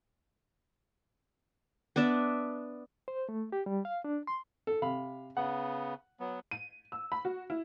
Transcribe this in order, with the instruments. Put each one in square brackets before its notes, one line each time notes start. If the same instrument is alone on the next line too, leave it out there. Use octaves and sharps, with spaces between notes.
[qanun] B3 D4 D5 E5
[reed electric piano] C5
A3
G4
G3
F5
D4
C6
[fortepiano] A4
C3 F5 B5
[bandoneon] C#3 B3 [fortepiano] F#5
[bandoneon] F#3 B3
[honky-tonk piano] D#7
E6
B5
F#4
E4